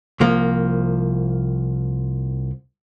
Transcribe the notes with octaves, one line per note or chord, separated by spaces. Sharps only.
C2 F3 A#3